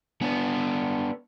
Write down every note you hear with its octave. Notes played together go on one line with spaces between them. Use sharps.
B3 D4